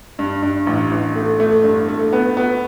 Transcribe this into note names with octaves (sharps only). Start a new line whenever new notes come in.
G2
G2
A1
A1
A3
A3
G2
A3
B3
B3